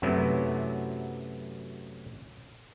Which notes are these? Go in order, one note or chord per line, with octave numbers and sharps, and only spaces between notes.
F#2 C3 F#3 A3 B3 E4